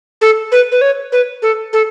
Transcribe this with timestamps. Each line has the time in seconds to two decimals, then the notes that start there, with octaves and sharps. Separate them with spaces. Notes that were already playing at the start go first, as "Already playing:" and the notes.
0.21 A4
0.52 B4
0.72 B4
0.81 C#5
1.12 B4
1.42 A4
1.73 A4